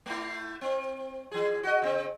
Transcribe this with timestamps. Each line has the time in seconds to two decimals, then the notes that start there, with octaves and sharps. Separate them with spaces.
0.06 A3 E4
0.61 C4
1.31 E3 G#4
1.63 F#4 D#5
1.82 C#3 C4